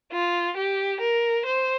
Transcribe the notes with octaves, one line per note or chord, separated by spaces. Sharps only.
F4
G4
A#4
C5